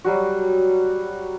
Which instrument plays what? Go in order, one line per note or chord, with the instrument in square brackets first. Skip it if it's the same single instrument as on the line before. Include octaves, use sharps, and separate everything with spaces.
[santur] F#3 G3 F#4